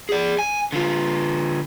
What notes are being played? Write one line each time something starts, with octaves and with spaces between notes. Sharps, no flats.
G#4 D5
G#5
D3 F4